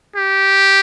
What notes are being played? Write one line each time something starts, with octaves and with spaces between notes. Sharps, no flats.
G4